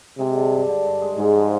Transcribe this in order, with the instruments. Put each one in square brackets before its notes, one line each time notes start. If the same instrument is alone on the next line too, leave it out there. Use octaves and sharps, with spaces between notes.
[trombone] C3 [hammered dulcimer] G#3
[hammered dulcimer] D3
G2
D3
G2
G#3
[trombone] G#2 [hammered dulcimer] G#3
[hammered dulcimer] F3